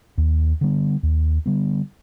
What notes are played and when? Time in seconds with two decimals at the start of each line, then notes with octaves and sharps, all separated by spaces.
0.18 D#2
0.61 D3 G3 B3
1.03 D#2
1.46 D3 G3 B3